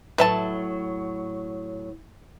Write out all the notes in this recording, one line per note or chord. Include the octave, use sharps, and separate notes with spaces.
A2 F#3 B4 E5 A5